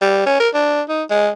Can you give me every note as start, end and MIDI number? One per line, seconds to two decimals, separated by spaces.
0.01 0.22 55
0.26 0.37 61
0.40 0.49 70
0.54 0.82 62
0.89 1.03 63
1.10 1.30 56